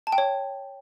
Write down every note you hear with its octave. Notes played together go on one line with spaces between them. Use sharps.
A5
G5
C#5